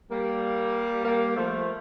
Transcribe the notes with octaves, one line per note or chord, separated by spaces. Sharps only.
G3 A#3
G3 A#3
F3 A3